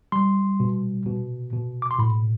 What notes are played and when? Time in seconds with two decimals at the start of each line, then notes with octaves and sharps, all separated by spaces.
0.12 G3 C6
0.60 B2
1.06 B2
1.53 B2
1.82 D6
1.91 C6
1.99 A2 B5